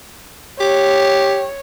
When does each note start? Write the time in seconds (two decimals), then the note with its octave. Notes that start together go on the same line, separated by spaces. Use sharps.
0.60 G4 C#5